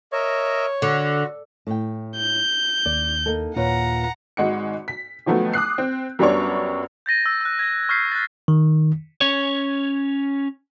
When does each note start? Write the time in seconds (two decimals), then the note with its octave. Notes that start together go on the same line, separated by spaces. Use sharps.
0.13 A#4 C#5 D#5 E5
0.82 D3 F#4
1.67 A2 G5
2.17 G6
2.86 D#2 D5
3.26 A#3 D#4 A4
3.56 D#2 A#2 F4 B4 C#5 F#5 A#5
4.37 G#1 G#2 G#3 F#4 C#7
4.88 B6
5.26 D#3 F3 F#3 A3 B3
5.53 D6 D#6 F#6 C7
5.78 C4
6.19 F#2 G3 B3 D4 C#5 C#6
7.06 G6 A6 A#6 D#7
7.26 E6
7.41 E6 F#6
7.59 G#6 A#6
7.89 C#6 F6 G6 B6 C7
8.12 F#6 A6
8.48 D#3
9.21 C#4 C#5